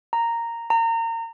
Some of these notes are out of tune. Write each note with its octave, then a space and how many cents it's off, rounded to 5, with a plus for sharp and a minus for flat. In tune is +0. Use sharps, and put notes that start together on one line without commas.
A#5 -10
A#5 -30